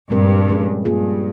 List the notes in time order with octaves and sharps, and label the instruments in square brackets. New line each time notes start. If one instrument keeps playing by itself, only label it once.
[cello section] G2 [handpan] A#2 G#3 C4 G4 A#4
[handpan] F3 G#3 C#4 G#4
[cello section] G2 [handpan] G3 A#3 F4 G#4